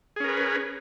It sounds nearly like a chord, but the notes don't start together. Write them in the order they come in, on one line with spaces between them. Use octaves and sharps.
G#4 C#4 A#4 B4